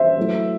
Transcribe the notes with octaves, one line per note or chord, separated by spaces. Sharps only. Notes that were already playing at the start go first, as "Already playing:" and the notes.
Already playing: C5 E5
F#3 A3 E4